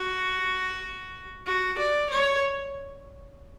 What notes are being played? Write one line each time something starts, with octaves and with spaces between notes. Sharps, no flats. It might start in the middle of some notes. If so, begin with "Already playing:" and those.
Already playing: F#4
F#4
D5
C#5